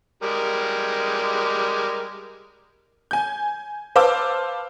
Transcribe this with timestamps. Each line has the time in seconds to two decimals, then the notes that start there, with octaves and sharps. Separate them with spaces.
0.23 G3 G#3 A#4
3.11 G#5 G6
3.95 B4 C5 F5 A5 D6 E6